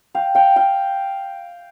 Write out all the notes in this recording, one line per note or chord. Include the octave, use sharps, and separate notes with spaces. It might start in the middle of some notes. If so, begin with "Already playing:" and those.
F5 G5
F5 G5
F5 G5